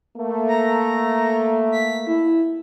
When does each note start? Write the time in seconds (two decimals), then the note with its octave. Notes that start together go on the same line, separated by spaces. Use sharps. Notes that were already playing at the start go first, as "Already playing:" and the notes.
0.17 A3 A#3
0.48 A#5
1.72 B6
2.07 E4